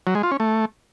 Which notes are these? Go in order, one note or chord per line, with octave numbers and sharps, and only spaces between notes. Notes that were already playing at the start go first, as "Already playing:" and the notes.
F#3
G#3
F4
C#4
A3